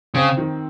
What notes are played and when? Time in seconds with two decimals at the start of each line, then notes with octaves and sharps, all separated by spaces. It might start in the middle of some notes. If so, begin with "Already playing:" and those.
0.14 C#3 C4
0.37 D#3